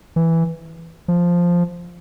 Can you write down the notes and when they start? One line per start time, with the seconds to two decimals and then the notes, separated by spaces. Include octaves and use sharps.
0.16 E3
1.08 F3